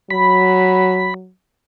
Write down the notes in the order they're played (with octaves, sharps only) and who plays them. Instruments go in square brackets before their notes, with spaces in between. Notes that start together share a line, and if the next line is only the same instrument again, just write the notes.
[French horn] F#3 [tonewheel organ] B5